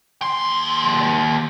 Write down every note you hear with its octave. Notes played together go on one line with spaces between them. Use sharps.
D#2 C6